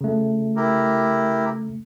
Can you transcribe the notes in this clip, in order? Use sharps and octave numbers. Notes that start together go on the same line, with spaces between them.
C#3 A3
E4 G4 A#4